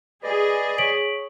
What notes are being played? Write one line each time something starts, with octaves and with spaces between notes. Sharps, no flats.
G#4 B4 D5 D#5
C#5 B6 D7 F#7